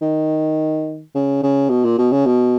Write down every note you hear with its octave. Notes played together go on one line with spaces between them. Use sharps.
D#3
C#3
C#3
B2
A#2
B2
C#3
B2